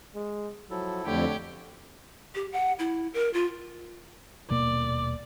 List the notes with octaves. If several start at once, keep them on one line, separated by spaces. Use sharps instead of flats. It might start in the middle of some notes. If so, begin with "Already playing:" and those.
G#3
F3 F#3 E4 A4
F2 D3 A3 G4 C#5
G4
F#5
E4
A#4
F4
D#1 B2 A#3 D5